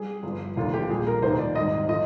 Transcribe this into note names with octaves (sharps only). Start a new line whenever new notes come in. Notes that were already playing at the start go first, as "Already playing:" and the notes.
Already playing: G3 G#4
G1 G2 F3
F1 D#2 D3 F3 F4
G4
A#1 A#2 G3 G#4
A#4
F1 D#2 D#3 C5
D5
G#1 G#2 G3 D#5
D3 F3 D#5